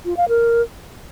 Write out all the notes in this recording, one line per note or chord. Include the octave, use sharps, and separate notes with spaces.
F4
F5
A#4